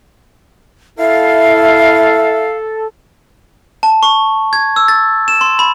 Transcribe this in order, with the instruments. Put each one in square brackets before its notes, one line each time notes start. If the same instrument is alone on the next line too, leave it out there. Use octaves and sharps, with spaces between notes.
[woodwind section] E4 F5 [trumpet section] A4 [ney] E5
[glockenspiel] A5
C#6
G#6
E6
A6
E7
C6
B5